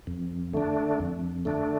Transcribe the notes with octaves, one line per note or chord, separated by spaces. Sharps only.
F2
D3 A3 D4
F2
D3 A3 D4